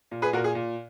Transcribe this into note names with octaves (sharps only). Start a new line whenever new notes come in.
A#2
G#4 B4
A#2 F#4 A#4
G#4
A#2